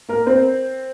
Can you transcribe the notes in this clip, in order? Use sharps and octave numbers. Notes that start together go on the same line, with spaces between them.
A#3 A#4
C4 C5